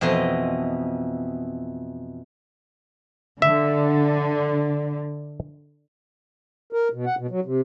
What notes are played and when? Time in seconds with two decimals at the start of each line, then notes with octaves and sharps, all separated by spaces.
0.01 F2 B2 E3 D#5 C6
3.42 D3 E5
6.73 A#4
6.93 B2
7.06 F#5
7.19 B2
7.31 F#3
7.46 C3